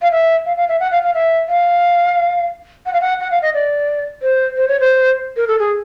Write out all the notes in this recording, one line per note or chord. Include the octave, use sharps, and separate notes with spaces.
F5
E5
F5
F5
E5
F#5
F5
F5
E5
F5
F#5
F5
F#5
F#5
F5
D#5
D5
C5
C5
C#5
C5
A#4
A4
G#4